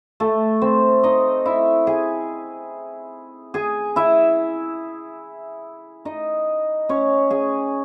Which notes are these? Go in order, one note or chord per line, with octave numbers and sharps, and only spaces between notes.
A3 A4
C4 C5
D#4 D#5
E4 E5
G#4 G#5
G#4 G#5
E4 E5
D#4 D#5
C#4 C#5
G#4 G#5